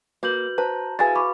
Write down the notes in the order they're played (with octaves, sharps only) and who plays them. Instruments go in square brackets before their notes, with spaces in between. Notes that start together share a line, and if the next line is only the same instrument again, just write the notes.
[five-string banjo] A#3 [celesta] F#4 G6 F#7 [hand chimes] B4
[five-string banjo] B4 [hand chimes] C5 A5 A#5
[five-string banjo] E4 G#4 [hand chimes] F#4 B4 F5 [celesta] A6
[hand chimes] B5 [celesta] C#6 D6